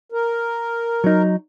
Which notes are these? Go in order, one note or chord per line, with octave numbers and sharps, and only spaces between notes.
A#4
F#3 D#4